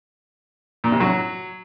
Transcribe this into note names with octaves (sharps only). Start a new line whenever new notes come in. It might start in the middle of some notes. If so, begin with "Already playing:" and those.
A#2
C3
F#3